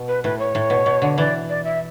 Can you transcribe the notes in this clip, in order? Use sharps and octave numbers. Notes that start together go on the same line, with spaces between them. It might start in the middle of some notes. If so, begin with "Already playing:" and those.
Already playing: B2
B4
A2 B4
C#5
A2
B2
B2
D3
E3 D5
D5
E5